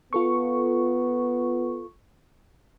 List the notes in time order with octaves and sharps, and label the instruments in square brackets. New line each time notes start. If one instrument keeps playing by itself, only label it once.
[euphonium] B3 [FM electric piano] F4 A4 C#6